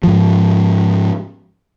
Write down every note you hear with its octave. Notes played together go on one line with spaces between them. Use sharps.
G#2 F3